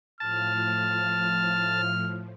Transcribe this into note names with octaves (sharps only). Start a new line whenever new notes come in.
A2 F3 A5 F6